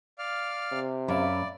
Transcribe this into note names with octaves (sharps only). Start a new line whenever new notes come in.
D5 F5 F6
C3
F#2 D5 E5 F5 B5